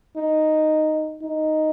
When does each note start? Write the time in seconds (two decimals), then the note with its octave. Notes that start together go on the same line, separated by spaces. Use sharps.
0.16 D#4
1.21 D#4